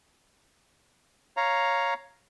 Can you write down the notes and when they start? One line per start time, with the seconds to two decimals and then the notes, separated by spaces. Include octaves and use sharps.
1.37 C#5 F5 A#5